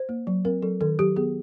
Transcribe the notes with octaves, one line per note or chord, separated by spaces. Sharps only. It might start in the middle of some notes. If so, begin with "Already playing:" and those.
Already playing: C5
A#3
F#3
C4 A#4
F#3 A4
D#3 A4
F#3 G4
B3 G#4